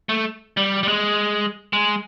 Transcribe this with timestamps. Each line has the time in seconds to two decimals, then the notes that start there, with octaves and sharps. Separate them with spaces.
0.09 A3
0.57 G3
0.83 G3
0.88 G#3
1.73 G#3